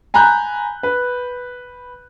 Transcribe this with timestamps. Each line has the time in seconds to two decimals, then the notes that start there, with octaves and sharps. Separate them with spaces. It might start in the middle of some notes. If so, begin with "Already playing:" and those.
0.14 G#5 A#5 B5 F#6 G6
0.83 B4